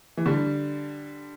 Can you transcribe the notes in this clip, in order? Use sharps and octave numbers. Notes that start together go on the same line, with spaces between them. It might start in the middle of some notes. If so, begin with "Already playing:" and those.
E3
D3 G3